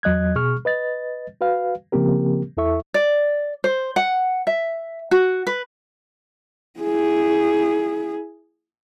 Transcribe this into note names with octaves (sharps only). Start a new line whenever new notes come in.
E2 F#3 D#5 F#6 G#6
B2 G#4 C#6 F6
B4 D#5 A6
F#4 B4 F5
C#3 F3 A#3 C4 G4 A#4
E2 E4 A4 E5 C#6
D5
C5
F#5
E5
F#4
B4
E4 G#4